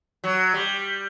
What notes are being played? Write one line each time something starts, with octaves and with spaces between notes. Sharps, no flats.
F#3
G3